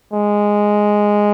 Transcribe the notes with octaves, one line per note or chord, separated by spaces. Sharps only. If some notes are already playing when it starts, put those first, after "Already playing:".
G#3